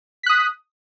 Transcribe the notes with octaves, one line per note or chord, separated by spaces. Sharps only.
D#6 F#6 B6